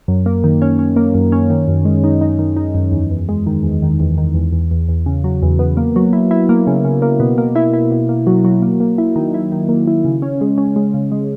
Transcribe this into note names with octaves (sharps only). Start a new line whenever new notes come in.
F#2
A#3
D#3
C#4
C#4
A#3
F#2
C#4
D#3
F#2
G#3
D#4
D#4
D#3
D#4
F#2
E2
E2
G#3
D#3
E2
D#3
E2
D#3
E2
E2
E2
E2
C#3
F#3
E2
B3
A#3
F#3
E4
E4
A#3
C#3
C#3
A#3
B2
A#3
E4
E4
B2
A#3
F#3
F#3
A#3
A#3
E4
D#3
E4
D#3
A#3
E4
C#3
C#4
G#3
C#4
G#3
C#3
G#3